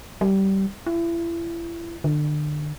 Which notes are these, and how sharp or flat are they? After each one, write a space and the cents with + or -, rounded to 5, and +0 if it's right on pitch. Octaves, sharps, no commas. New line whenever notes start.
G3 -20
E4 +35
D3 +30